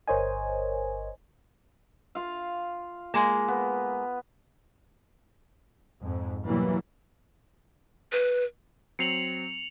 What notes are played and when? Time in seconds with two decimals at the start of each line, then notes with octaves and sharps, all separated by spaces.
0.08 G1 A#4 C5 C#5 D#5 G#5
2.15 F4 F5
3.14 G#3 A#3
3.48 B3
6.02 F2 G#2
6.45 B2 E3 F#3 G3 A#3
8.12 B4
8.99 F#3 C4 C7 C#7 F7 F#7